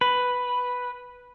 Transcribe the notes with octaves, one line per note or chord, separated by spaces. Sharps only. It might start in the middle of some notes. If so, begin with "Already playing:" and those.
B4